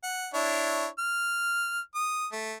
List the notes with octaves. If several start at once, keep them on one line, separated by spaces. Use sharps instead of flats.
F#5
D4 E4 C#5
F6
D#6
A3